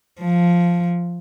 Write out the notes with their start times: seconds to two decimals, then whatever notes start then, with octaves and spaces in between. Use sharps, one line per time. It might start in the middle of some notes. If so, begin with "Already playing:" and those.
0.20 F3